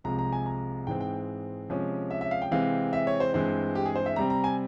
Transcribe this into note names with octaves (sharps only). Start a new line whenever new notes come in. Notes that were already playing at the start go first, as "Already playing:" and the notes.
C2 C3 F3 G#3 A#5
A#5
G#5
A#5
G#2 E3 G#3 C4 G5
G5
C3 F3 G#3 C#4
E5
E5
F5
G5
C3 E3 G#3 C4 F5
E5
C#5
C5
G2 E3 G#3 C4 C5
G4
G#4
C5
E5
C3 G3 C4 A#5
A#5
G#5